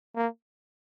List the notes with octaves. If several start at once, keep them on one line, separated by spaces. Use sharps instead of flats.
A#3